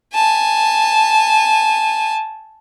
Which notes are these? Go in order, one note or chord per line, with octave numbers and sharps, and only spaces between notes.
G#5 A5